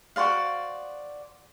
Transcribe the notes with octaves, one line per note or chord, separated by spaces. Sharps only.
F#4 C5 D5 F5